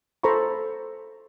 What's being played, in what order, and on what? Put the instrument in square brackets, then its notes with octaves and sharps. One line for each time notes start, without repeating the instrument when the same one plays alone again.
[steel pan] A4 C5 A#5 B5 C#6